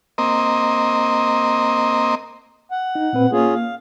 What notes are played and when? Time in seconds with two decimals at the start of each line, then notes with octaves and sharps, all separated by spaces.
0.18 A#3 C4 D#5
2.71 F#5
2.95 D#4
3.13 A#2 C4 B4
3.32 A#3 C#4 F4 G#4
3.54 F5